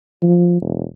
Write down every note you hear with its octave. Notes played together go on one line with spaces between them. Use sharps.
F3
E1